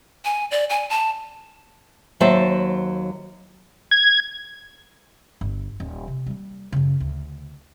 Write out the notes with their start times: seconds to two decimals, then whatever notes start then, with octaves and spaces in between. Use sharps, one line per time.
0.25 G#5
0.51 D5
0.70 G#5
0.90 A5
2.20 D#2 F#3 C5 E5 A5
3.91 G#6
5.41 G1
5.80 D#1
6.08 C3
6.26 G3 A#3
6.72 F#2 C#3
7.00 D2